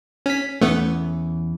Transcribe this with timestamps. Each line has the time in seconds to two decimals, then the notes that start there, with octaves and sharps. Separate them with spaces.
0.26 C#4 B6
0.62 E2 E3 A3 B3 C#4